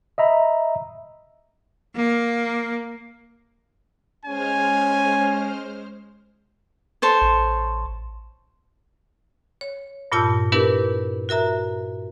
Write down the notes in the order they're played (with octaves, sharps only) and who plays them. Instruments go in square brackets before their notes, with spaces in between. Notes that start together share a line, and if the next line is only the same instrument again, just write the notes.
[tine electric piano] D#5 E5 A#5 B5
[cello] A#3
[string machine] G#3 C5 F6 [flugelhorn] C#4 [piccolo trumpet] G#5
[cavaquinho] A4 C5 C#5
[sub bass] A1
[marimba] C#5
G2 A#2 F4 A5 E6 G6
B3 D4 E4 G4 A#4 B4
F#4 A#4 E5 A#5